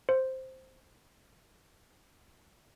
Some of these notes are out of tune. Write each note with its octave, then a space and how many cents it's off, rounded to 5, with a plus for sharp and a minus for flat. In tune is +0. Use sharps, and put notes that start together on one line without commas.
C5 +0